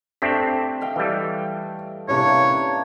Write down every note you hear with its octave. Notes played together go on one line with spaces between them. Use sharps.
A3 C4 D4 G4 B6
D#5 F5 G5
E3 G3
C3 A#3 C#4 D4 E4 B4 C#5